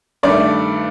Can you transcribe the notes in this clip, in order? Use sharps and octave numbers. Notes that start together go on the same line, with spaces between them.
G2 D#3 A3 D5